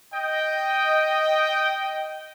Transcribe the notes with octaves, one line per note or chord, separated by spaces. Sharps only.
D#5 G5